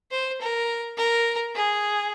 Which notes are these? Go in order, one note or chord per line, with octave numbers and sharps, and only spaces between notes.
C5
A#4
A#4
G#4